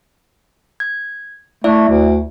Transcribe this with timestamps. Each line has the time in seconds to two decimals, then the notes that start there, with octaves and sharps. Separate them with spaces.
0.80 G#6
1.64 A3 E4 D5 E5
1.89 D2